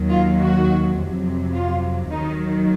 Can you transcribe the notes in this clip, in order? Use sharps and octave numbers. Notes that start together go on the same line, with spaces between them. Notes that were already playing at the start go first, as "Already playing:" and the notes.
Already playing: D#2 D#3 F#3
F4
F#4
F2 C3 F#3
F4
D#2 D#3 F#3 D#4